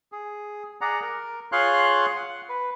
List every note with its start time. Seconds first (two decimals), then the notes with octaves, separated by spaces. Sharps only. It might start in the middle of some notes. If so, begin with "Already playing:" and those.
0.12 G#4
0.81 G#4 D5 F#5 A#5
1.02 A#4
1.52 F4 G#4 C#5 F5 C6 F#6
2.16 F#5
2.49 B4